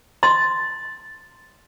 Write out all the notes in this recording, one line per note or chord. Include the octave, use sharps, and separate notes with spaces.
C6 A6